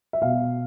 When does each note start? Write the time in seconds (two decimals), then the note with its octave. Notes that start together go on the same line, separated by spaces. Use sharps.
0.13 E5
0.21 B2 F5